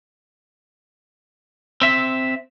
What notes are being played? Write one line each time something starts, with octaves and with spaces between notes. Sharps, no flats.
C4 E5